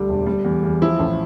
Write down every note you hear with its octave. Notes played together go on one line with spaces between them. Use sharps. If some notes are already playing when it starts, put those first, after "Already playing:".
Already playing: D2 D3 G3 D4
E1
G3
E2
E2
F3 E4
A1